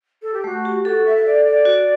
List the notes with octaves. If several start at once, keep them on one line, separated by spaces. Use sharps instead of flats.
A4
G4
A3 F#4
G4
F#4 G4 A4
E5
E5
D5
D5
F#4